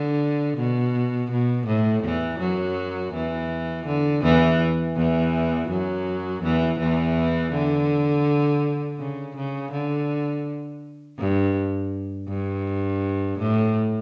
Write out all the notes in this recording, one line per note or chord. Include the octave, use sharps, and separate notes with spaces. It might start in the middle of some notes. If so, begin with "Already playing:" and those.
Already playing: D3
B2
B2
A2
E2 E3
F#2 F#3
E2 E3
D3
E2 E3
E2 E3
F#2 F#3
E2 E3
E2 E3
D3
C#3
C#3
D3
G2
G2
A2